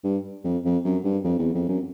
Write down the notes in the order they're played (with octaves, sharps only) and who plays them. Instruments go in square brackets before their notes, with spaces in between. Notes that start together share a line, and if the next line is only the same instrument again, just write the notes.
[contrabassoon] G2
F2
F2
F#2
G2
F2
E2
F2
F#2